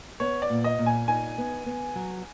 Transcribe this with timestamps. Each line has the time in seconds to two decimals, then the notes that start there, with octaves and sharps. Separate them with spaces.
0.20 B3 C#5
0.42 D5
0.50 A#2
0.64 D#5
0.79 A#2
0.86 G#5
1.08 D#4 G#5
1.38 B3
1.66 B3
1.95 F#3